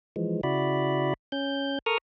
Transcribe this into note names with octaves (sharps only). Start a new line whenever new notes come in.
E3 F3 G#3
C#3 E4 F#4 D5 B5
C#4 G6
A4 A#4 A#5 C#6 D#6 F6